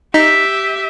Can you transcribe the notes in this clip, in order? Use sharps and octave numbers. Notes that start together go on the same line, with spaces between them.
D#4 G4 E5 B6